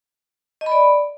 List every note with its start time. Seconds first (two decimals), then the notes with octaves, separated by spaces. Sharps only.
0.61 D#5
0.66 B5
0.72 D5